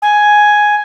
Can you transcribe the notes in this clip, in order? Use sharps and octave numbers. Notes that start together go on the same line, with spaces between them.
G#5